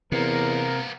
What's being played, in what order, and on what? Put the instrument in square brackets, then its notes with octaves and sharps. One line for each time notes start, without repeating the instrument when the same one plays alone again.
[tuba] E2 [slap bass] C3 [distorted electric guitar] A#3 B3 [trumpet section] A#4